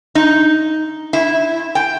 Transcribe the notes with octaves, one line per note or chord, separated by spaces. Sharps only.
D#4
E4
G5